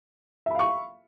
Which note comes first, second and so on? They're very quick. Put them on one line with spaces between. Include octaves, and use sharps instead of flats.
E5 B5 F5 C#6